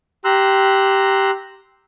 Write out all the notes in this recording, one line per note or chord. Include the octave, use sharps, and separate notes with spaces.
G4 A#5 C6 E6 F#6